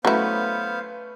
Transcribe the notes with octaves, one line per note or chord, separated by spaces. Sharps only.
F#3 A3 B3 C#4 E4 B4 C5 F5